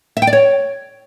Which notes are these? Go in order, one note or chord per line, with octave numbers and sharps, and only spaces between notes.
E5
G5
D5
C#5